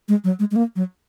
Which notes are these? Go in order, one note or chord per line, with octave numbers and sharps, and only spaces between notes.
G#3
F#3
G#3
G#3
A#3
F#3